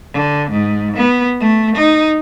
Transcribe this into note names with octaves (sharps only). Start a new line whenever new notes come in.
D3
G#2
B3
A3
D#4